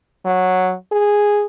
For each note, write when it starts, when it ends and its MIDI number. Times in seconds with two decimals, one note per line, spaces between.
0.25 0.74 54
0.92 1.46 68